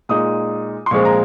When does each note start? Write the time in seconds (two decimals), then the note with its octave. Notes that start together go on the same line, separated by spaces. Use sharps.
0.09 A#2 G#3 D#4 D#6
0.86 C6
0.91 A#2 F3 G#3 C4 C#6
1.05 A#5